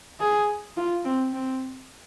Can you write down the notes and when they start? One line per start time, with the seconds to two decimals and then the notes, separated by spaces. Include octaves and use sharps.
0.20 G#4
0.77 F4
1.04 C4
1.33 C4